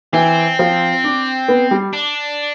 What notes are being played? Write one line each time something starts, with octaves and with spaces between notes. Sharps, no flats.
E3 C4
F3
D4
B3
G3
D4